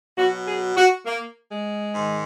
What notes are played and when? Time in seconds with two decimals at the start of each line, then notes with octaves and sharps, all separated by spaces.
0.17 B2 F#3 F#4
0.46 G#4
0.76 F#4
1.05 A#3
1.50 G#3
1.94 G#2 D#3